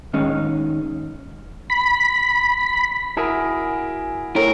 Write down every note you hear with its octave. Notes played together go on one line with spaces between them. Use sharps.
A2 D#3 G#3 C#4 D#4
B5
E4 F#4 G#4 A#4
A2 A#4